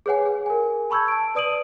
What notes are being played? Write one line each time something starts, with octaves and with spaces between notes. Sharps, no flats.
G#4 B4 C#5 F#5 G#5
G#4
A#4 G#5
A5 B5 C#6 E6 G6 G#6
A5 D7
B4 D5 D#6 D7 D#7 F#7